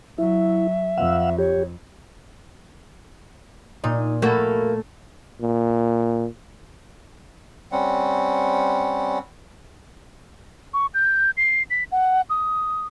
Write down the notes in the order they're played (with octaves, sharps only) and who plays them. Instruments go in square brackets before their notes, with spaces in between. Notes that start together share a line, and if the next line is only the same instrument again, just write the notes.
[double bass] F#3 [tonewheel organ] E4 [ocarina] E5
[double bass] F2 [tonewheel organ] F5 F#5 E6
[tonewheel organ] G4 [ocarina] C#5
[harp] A#2 [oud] D#4
[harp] A3 A4 [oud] A#3 E4 F#4
[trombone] A#2
[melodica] G3 C4 C#4 F#5
[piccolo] C#6
G6
C7
B6
F#5
D#6